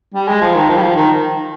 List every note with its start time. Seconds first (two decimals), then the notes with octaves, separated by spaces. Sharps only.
0.15 G3
0.28 G#3
0.41 F3
0.55 D#3
0.69 F3
0.76 G3
0.82 F3
0.96 D#3